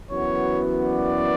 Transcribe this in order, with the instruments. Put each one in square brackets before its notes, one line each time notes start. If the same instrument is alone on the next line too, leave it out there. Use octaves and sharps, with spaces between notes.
[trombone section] F#2 E3 B3 F#4 [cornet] C#5
[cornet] D5